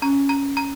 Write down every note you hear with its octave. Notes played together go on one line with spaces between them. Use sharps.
C#4 A#5
A#5
A#5